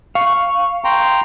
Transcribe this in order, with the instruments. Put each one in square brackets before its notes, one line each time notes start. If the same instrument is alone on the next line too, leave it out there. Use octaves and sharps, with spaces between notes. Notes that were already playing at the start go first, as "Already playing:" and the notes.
[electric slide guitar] F5 [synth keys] C#6
[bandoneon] G5 A#5 C6